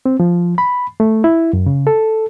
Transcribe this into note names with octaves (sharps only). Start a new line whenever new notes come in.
C4
F3
B5
A3
E4
F#2
C#3
A4